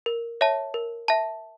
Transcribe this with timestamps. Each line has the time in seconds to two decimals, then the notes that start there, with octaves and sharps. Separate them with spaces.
0.06 A#4
0.41 C#5 E5 A5
0.74 A#4
1.08 E5 A5